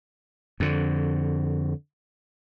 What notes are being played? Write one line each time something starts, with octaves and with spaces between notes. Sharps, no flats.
F2 D3